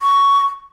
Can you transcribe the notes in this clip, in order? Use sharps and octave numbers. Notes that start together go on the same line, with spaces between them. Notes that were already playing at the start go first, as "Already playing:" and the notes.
C#6